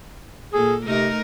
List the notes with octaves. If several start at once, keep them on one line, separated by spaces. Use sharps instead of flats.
A#2 G#4 A4
C3 A3 D#4 A#4